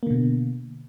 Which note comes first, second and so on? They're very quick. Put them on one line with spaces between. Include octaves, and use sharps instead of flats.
A#3 D3 B2